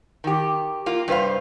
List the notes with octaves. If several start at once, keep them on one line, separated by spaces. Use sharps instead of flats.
D#3 G4
A#3 F4
G2 C3 B4 C5 F5